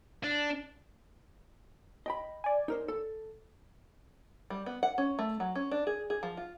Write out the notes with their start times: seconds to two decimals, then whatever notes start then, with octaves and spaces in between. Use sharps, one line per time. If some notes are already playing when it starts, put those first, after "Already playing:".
0.24 D4
2.06 D#5 G5 B5
2.44 D5 G#5
2.68 D#4 A#4 C5
2.88 A4
4.50 G3
4.66 B3
4.83 F#5
4.98 C#4
5.19 A3
5.40 F#3
5.55 C#4
5.71 D4
5.87 G#4
6.10 G#4
6.23 F3
6.37 F4